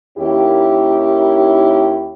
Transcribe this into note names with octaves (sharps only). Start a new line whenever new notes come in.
D#2 D#3 C#4 E4 G4